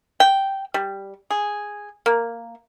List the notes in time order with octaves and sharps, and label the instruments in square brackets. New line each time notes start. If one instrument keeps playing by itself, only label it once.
[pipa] G5
G3
G#4
A#3